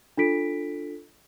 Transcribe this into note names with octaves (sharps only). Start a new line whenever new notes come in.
D4 F4 A4 B6 D7